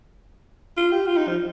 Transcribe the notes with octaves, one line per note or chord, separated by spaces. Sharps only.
F4
G4
F4
D#4
F3